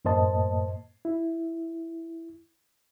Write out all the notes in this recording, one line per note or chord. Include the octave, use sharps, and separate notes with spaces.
F#2 A2 A#3 C5 D#5 A5
E4